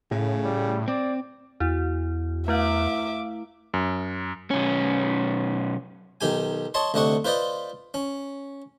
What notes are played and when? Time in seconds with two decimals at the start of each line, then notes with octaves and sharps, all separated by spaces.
0.11 A2 C#3
0.44 G3
0.88 C4 D5
1.60 E2 E4 F#4
2.48 A3 E4 E5 F5 D6
3.74 F#2
4.51 B1 C#4
6.21 B1 D#3 G4 G#5
6.74 C#5 D#5 A5 C6
6.94 D2 C3 D4 D#5 F#5 C#6
7.25 F4 B4 C5 D5 D#5
7.94 C#4